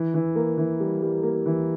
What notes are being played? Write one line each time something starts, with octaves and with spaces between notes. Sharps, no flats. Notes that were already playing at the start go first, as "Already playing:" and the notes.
Already playing: E3
E3
A#3
E3
G3
G3
A#3
E3